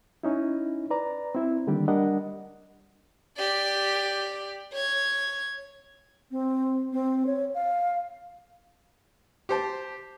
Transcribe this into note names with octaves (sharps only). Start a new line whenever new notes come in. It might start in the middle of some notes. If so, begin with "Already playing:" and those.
C#4 D#4 E4
B4 D5 A#5
C4 E4
D3 D#3 G3 A#3 D4 G4
G3 D4 A#4 D#5 F#5
G4 D5
C#5 G#6
C4
C4
C#5
F5
G4 C5 A5